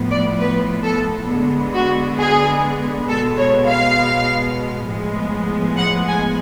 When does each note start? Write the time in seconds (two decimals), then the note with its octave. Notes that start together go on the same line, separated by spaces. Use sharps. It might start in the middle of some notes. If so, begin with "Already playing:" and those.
Already playing: A2 F3 B3
0.10 D5
0.39 B4
0.84 A4
1.30 D3 G#3 B3
1.74 F#4
2.18 G#4
3.08 B2 G#3 B3 A4
3.39 C#5
3.69 F5
4.87 A2 F3 G#3 B3
5.77 F#5
6.08 G#5